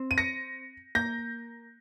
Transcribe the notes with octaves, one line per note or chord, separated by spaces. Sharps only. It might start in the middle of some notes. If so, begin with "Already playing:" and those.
Already playing: C4
D#7
A#6 C#7
A#3 G6 A#6